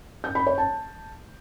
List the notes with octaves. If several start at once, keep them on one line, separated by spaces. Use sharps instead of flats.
G6
B5
C#5
A5